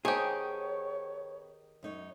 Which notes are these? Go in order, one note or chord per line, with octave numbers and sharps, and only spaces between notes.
D#3 B3 G4 G#4 C5 C#5 A5
F#2 D#4 C#5